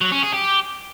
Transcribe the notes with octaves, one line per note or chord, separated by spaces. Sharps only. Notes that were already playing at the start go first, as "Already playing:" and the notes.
F#3
C#4
G#4
G4